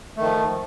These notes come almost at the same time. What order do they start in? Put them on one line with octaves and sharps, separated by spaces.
A3 D#3 F3